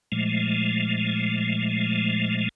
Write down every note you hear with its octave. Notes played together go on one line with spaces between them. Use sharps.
A#2 F3 G#3 A3